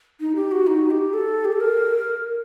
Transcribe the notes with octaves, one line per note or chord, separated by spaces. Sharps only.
D#4
G4
F#4
D#4
G4
A4
G4
A4
A#4